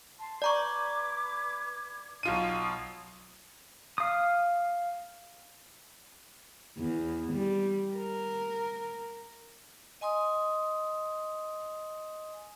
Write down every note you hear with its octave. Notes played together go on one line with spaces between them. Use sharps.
A5 C6
B4 D5 A#5 C#6 D6 G#6
B1 F4 D#6 D#7
F5 D#6
E2
G3
A#4
D#5 G#5 C6 D#6